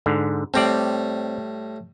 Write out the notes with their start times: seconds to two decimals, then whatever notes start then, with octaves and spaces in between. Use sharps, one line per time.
0.06 G#2 D3
0.54 A2 G3 C4 D5